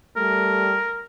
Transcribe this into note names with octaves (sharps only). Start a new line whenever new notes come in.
G3 A3 A#4